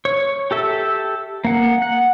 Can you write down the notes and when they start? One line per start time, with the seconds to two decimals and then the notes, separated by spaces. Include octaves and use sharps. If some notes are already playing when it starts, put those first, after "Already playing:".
0.05 C#5
0.51 G4 A4 E5
1.45 A#3 F#5
1.82 F#5